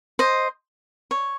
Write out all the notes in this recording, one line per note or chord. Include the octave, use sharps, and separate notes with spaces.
C5 D#5
C#5